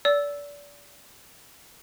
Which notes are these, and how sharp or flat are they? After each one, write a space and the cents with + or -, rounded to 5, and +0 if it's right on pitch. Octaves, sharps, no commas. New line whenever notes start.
D5 -30 E6 +0